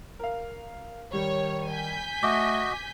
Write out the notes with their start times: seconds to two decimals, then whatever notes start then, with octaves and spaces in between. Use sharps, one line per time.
0.19 A#4 F5
1.13 D#3 G3 C#5
1.70 G#5 G6 B6
2.23 A3 F#4 D#5 D6